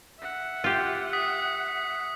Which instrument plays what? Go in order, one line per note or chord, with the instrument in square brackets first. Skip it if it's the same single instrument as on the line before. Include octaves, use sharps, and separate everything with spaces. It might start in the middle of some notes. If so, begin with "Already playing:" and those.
[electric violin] E5 F#5
[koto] F4 G4
[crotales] D#6 B6